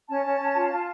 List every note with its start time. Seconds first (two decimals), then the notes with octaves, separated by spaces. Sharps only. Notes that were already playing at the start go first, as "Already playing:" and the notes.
0.08 C#4 A5
0.25 C#4
0.40 C#4
0.55 F4
0.71 F4